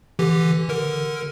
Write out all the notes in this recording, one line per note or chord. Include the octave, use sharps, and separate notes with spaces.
D3 E3 G4
D3 A#4